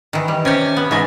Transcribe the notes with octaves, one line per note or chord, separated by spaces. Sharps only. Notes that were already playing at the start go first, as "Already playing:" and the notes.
D#3 E3
G3
C3 C#4 G4
B3
G#2 E3 G#3